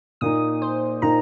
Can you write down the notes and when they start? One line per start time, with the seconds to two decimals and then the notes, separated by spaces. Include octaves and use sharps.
0.21 A#2 A#3 D#4 D#6
0.62 C5
1.02 A#2 A#3 D#4 A#5